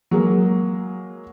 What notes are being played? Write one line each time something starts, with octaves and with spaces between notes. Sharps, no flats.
F#3 G#3 A#3